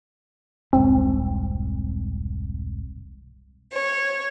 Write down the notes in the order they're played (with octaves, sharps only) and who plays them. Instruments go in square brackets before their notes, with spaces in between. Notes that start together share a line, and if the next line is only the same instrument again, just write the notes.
[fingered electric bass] E1 C2 G#2 [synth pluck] C4
[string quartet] C#5